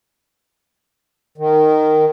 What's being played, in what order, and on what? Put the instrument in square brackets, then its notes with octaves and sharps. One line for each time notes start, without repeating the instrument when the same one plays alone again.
[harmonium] D#3